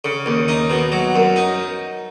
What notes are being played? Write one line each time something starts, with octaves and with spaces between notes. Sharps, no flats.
C#3
D#2
D#4
B2
F#3
F#2
D#4